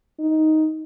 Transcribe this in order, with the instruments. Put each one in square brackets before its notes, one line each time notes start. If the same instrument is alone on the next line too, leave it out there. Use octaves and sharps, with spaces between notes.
[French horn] D#4